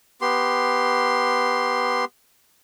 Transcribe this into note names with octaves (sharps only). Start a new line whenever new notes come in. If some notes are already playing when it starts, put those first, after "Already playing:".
B3 G4 C6